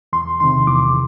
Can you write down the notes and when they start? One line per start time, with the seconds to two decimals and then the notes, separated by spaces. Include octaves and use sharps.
0.13 E2 C6
0.40 C3 D#3 C6
0.67 E2 D6